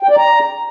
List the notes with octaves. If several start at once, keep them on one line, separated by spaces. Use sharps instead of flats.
G5
D5
A#5